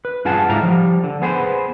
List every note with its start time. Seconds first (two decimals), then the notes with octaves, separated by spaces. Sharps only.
0.05 B4
0.25 G2 F4 G#4 F#5 A5
0.49 G#2 F#3 A3 E4 F5 A#5
0.63 F3 G3
1.04 D3
1.22 B3 G#4 B4 C5